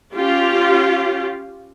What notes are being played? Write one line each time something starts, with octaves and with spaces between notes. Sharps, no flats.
C#4 F4 G4